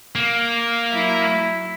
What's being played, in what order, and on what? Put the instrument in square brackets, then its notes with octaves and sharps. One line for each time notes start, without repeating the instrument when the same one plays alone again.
[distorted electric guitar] A#3
[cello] F#3 E4